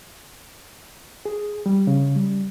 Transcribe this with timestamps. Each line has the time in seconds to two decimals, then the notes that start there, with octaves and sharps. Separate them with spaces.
1.25 G#4
1.66 G3
1.87 C#3
2.16 G3